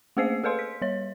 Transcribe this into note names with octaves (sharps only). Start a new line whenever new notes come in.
A3 A#3 G#4 C5 F5 C7
G#4 A4 B4 F5 C6
B6
G3 C#5